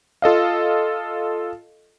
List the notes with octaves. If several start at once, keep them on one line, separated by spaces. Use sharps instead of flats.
F4 A4 D#5 F5